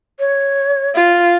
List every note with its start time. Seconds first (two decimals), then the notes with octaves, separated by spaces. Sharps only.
0.19 C#5
0.95 F4